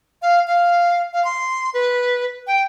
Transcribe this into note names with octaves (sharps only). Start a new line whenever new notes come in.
F5
F5
F5
C6
B4
G5